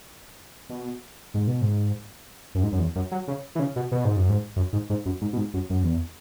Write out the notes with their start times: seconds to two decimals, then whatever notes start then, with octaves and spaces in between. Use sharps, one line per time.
0.70 B2
1.34 G#2
1.47 B2
1.62 G#2
2.55 F#2
2.63 G#2
2.72 F#2
2.79 E2
2.95 F#2
3.11 F#3
3.28 C#3
3.55 E3
3.59 C#3
3.76 B2
3.92 B2
4.05 G#2
4.17 F#2
4.29 G#2
4.56 F#2
4.73 G#2
4.90 G#2
5.05 F#2
5.21 G#2
5.33 B2
5.37 G#2
5.54 F#2
5.70 F#2
5.83 E2